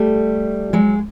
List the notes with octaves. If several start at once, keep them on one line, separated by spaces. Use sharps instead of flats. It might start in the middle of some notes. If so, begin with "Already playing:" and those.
Already playing: G3 A3
F#3 G#3